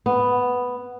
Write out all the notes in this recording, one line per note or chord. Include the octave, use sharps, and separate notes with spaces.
B3